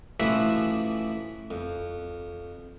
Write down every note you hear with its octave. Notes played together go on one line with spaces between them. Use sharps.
A1 E3 F3 F#4 E5
F2